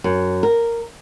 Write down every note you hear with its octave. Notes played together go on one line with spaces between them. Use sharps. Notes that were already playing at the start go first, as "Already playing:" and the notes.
F#2
A#4